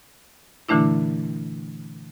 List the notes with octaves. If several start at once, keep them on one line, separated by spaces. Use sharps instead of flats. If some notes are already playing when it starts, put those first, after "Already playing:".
A#2 D3 E3 A3 D4 E4